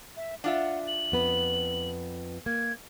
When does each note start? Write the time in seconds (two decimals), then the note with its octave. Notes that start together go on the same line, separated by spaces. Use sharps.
0.17 E5
0.44 D4 F4 E5 F#5
0.88 F#7
1.12 F2 B3 B4
2.46 A#3 G#6